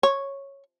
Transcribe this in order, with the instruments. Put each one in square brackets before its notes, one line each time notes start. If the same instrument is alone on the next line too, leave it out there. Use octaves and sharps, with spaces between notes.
[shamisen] C#5